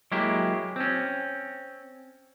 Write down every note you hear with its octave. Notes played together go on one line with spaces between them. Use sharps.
F#3 G#3 A#3 E4 G4
C4 C#4